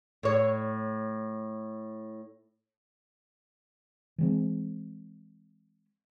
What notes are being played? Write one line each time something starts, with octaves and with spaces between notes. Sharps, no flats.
A2 C#5
E3 G#3 C4